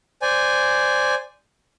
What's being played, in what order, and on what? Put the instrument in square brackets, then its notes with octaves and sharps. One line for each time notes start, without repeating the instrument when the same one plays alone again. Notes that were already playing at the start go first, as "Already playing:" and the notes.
[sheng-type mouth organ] C5 D5 G#5